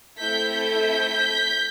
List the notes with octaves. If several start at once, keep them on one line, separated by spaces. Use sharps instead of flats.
A3 C4 E4 A4 G6 B6
G6 B6